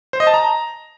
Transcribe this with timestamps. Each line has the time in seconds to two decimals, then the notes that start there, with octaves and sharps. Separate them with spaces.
0.13 C5
0.20 D#5
0.27 A5
0.34 A#5